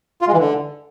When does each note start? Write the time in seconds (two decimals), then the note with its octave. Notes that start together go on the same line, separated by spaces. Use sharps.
0.21 F4
0.27 G#3
0.33 E3
0.39 D3